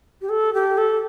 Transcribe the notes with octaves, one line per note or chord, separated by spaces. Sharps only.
G4
A4
G4
A4